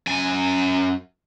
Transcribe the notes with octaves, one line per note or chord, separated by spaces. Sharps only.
F#2 G#5